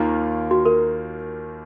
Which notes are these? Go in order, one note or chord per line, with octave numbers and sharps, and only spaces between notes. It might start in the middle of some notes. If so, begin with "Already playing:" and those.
Already playing: D#2 D#3 A#3 F4
F#4
A#4